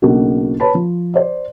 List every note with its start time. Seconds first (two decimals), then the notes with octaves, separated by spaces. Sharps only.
0.02 B1 C#3 A#3 D4 F#4
0.60 B4 C#5 A5 B5
0.74 F3
1.14 C5 D5